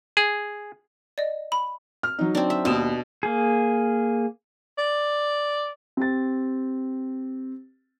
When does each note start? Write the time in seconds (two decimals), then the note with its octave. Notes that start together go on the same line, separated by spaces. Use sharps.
0.17 G#4
1.18 D5 D#5
1.52 B5
2.03 F6
2.19 F#3 D#4
2.35 C4 D4
2.50 E5
2.65 D#2 B2 D#6 E7
3.23 A#3 G#4
4.78 D5
5.97 C4 G4 A6